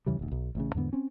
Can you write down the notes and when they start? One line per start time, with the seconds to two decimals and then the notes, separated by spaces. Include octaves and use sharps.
0.06 E2 C#3 E3 G3
0.19 D#1 D2
0.31 B1
0.55 A1 A2 C#3
0.75 E2 G#2 D3 B3
0.93 C4 C#4